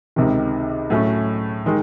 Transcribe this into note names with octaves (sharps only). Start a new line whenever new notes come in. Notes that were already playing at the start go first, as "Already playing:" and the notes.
C#2 C3 D#3
A2 F#3 A3 C#4
D#3 G#3